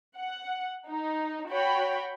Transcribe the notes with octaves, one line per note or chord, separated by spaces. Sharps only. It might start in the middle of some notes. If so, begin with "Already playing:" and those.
F#5
D#4
F#4 C#5 G5 B5